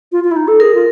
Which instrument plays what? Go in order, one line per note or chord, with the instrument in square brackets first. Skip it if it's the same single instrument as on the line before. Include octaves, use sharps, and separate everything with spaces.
[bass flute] F4
F4
E4
D#4
A4
[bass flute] G#4 [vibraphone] A#4
[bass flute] F4